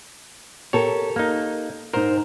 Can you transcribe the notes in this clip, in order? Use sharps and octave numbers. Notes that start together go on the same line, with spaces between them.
G4 A4 A#4 C#5
A#3 D#4
G#2 D#4 A#4 C5